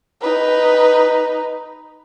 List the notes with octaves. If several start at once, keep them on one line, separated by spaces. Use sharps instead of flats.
D#4 B4